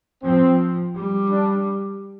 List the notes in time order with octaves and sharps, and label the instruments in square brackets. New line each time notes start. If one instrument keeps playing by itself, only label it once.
[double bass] F3 [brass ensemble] C4
[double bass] G3
[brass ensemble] D4